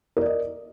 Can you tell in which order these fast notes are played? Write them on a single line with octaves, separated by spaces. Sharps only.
A#4 D5 D#5